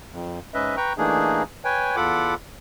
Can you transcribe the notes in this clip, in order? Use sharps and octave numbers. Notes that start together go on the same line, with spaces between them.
F2
G#2 C#4 B4 D#5 E5
B4 G5 A#5 C#6
E3 A3 A#3 D4 D#4 G#4
B4 C#5 G5 G#5
E2 F4 A4 F#5 B5 D6